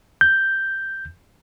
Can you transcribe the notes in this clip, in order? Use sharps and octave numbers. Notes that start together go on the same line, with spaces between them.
G6